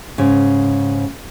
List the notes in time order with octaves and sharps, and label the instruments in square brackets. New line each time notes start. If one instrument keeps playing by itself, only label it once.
[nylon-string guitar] G#2 C#3